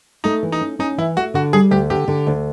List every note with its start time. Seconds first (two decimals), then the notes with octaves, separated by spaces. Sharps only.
0.24 A3 D#4
0.43 E3
0.52 D#4
0.61 C#4
0.79 C#4 D#4
0.98 E3 E4
1.16 A3 F#4
1.34 D3 F#4
1.53 G3 G#4
1.71 D2 G4
1.90 D3 G4
2.08 D3
2.27 D2